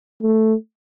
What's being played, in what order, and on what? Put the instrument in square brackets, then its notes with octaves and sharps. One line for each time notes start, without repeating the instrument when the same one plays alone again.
[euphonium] A3